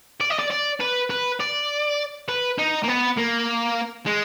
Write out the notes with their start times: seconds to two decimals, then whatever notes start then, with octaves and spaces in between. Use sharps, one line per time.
0.21 D5
0.30 D#5
0.39 D5
0.51 D5
0.80 B4
1.10 B4
1.40 D5
2.28 B4
2.58 D#4
2.83 A#3
2.88 B3
3.18 A#3
4.06 G#3